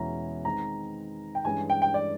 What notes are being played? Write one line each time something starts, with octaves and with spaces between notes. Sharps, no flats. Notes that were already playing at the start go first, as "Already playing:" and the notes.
Already playing: E2 B2 G#3 C#4 E4 A#5
D#3 G#3 C4 D#4 A#5
G5
G2 E3 G#3 C#4 G#5
G5
G5
D5